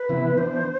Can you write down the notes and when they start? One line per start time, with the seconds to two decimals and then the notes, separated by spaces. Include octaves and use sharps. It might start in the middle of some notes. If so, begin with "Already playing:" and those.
Already playing: B4
0.09 C3 E3 B3 E4
0.38 E3 B3 D4 C5